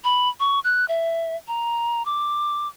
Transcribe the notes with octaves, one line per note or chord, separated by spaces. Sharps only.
B5
C#6
F#6
E5
A#5
D6